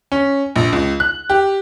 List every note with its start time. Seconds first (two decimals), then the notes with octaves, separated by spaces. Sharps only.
0.12 C#4
0.56 A#1
0.73 C#2
1.00 F#6
1.30 G4